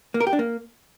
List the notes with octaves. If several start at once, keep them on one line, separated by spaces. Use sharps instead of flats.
A#3
A#4
G4
D4
A#3